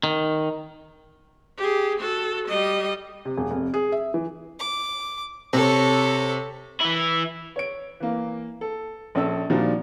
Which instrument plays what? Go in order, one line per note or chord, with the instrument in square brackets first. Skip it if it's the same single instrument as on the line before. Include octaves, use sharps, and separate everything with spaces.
[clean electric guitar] D#3
[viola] G4 G#4
F#4 A4
G3 D#5
[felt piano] C3
E1
F1
G#4
E5
E3
[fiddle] D6
[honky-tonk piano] C3 [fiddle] A4 C#5
[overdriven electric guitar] E3 E4
[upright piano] C#5 D7
E3 A#3
A4
A#1 C#4 A4 E6
A#2 D#3 F3 G3 D4 F#4